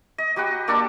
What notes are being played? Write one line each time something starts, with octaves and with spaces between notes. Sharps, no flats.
D#5
F#3 G4 B4 F#5
A#3 D4 A4 D5